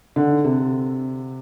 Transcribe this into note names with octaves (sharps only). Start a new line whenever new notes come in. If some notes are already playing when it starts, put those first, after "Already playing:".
D3
C3